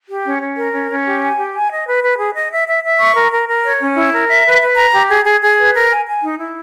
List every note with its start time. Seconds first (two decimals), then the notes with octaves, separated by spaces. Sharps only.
0.09 G4
0.25 C#4
0.41 C#4
0.57 A#4
0.72 C#4
0.89 C#4
1.05 G4
1.21 G#5
1.37 G4
1.54 G#5
1.70 D#5
1.86 B4
2.03 B4
2.19 G#4
2.34 D#5
2.50 E5
2.67 E5
2.82 E5
2.99 C#6
3.15 A#4
3.32 A#4
3.48 A#4
3.64 C#5
3.80 C#4
3.96 E4
4.13 A#4
4.29 E5
4.45 B4
4.61 B4
4.76 A#5
4.93 G4
5.09 G#4
5.25 G#4
5.41 G#4
5.57 B4
5.74 A#4
5.90 G#5
6.06 G#5
6.22 D#4
6.39 E4